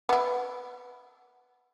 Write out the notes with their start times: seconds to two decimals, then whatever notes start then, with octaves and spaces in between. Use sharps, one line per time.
0.09 B3 E4